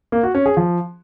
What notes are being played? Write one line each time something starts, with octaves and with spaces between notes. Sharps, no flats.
A#3
F#4
C#4
G#4
F3